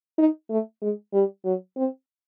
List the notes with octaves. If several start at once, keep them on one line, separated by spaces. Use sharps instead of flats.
D#4
A3
G#3
G3
F#3
C4